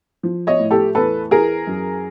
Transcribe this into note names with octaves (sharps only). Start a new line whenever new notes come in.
F3
C#5 D#5
A2
G4 A4
E2 A4 B4
E3 G#4 A#4
F#2